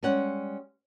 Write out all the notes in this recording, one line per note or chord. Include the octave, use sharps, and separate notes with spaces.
G3 G#3 C#4 F#5